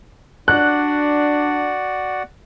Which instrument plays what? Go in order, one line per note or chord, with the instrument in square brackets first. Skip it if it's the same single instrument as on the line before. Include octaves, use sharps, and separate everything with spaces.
[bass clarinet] D4 [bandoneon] F#4 D5 F#5 [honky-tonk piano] F#6